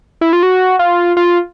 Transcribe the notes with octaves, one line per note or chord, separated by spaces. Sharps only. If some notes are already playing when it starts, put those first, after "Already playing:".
E4
F4
F#4
F4
F4